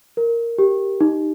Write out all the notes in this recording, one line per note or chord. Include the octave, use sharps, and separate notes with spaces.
A#4
G4
D#4